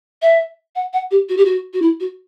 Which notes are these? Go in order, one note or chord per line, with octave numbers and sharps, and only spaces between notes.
E5
F#5
F#5
G4
F#4
G4
F#4
F#4
E4
F#4